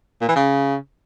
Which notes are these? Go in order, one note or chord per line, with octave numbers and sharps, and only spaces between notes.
A#2
E3
C#3